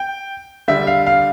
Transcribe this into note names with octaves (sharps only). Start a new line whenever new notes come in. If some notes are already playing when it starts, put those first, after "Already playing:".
Already playing: G5
D3 G3 E5
F5
F5